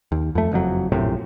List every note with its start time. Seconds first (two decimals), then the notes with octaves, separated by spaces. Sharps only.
0.12 D#2
0.35 F2 A3
0.51 F#1 F2 F#3
0.92 A#1 F#2 A2 C3